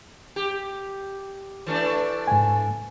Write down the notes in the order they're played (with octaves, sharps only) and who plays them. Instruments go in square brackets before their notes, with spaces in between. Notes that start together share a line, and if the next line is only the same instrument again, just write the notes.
[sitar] G4
E3 A3 D4
[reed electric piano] G#2 G#5